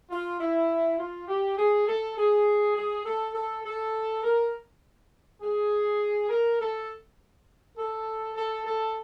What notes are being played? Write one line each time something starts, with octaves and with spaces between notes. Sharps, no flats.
F4
E4
F4
G4
G#4
A4
G#4
G#4
A4
A4
A4
A#4
G#4
A#4
A4
A4
A4
A4